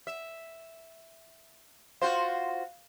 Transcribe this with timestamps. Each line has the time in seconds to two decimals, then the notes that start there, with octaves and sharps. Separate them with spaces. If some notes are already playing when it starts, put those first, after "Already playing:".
0.07 E5
2.02 F4 F#4 C5 F5